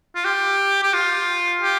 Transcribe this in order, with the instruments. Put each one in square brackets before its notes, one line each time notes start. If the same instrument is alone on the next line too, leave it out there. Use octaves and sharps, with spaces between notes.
[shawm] F4
G4
G4
F4
G4